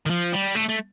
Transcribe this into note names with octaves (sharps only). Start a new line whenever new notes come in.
D#3
F3
G3
A3
A3